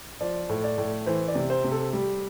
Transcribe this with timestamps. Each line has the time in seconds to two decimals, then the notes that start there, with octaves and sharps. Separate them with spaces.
0.20 F3 D5
0.49 A2
0.64 D5
0.78 A2
1.06 E3 C5
1.28 D5
1.35 C3
1.50 C5
1.64 C3
1.71 A4
1.93 G3 G4